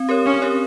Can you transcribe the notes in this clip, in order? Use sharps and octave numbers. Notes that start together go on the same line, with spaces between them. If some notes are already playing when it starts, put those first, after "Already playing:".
Already playing: C4
G4 A#4 C#5
C4 C#4
G4 A#4 C#5